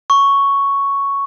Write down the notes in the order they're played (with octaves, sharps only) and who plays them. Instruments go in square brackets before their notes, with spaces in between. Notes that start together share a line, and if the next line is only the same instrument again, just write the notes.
[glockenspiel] C#6